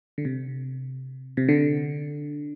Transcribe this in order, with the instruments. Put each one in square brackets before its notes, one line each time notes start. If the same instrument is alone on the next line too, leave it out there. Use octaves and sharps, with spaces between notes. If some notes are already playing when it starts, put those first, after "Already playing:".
[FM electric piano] D3
C3
C3
D3